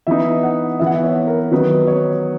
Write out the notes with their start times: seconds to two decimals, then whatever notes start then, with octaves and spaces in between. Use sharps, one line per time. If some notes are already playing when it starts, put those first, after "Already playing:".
0.07 E3 B3 D#4 E5
0.43 F#5
0.79 E3 B3 E4 E5
0.87 F#5
0.93 E5
1.03 C#5
1.27 A#4
1.51 D#3 F#3 B3 D#4 B4
1.87 C#5